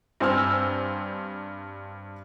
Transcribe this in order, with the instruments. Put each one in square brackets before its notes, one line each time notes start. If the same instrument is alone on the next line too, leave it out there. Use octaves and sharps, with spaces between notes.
[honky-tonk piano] G2 C4 C5 G#5 E6 F6